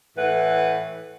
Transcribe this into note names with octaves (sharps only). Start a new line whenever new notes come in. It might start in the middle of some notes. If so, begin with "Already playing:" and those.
A2 E3 B4 F#5